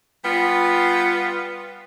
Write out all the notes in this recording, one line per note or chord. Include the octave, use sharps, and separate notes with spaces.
G3 B3 F4